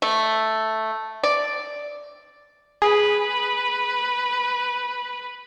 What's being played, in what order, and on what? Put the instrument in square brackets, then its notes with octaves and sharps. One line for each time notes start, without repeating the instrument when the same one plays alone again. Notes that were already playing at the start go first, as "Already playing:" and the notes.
[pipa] A3
D5
[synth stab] G#4 [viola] B4